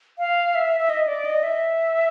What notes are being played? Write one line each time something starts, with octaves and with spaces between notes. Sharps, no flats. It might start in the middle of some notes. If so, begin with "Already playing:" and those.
F5
E5
E5
D#5
D5
D#5
E5